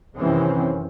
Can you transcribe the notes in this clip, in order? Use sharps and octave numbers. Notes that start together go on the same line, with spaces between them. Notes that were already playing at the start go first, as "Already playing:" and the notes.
F#2 C3 D#3 E3 C4 C#4